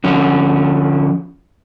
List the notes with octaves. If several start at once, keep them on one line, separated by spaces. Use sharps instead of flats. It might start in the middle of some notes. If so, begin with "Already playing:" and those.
D3 F3 C#4